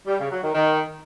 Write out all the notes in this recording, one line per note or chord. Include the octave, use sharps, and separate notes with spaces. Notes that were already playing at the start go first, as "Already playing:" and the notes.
G3
C#3
F#3
D#3
D#3